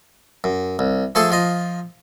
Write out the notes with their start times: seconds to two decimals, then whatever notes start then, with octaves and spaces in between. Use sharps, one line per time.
0.44 F#2
0.79 C2
1.15 F3 A3 G#4 A4 A5 C6
1.31 F3 F4 D#5